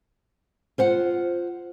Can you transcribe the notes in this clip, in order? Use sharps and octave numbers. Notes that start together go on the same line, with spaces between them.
F4 C5 F#5